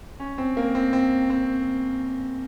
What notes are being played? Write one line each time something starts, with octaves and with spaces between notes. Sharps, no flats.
C#4
C4
A#3
C4
C4
C4